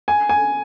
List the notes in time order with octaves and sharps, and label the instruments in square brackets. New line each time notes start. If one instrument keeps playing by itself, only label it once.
[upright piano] G#5
G#5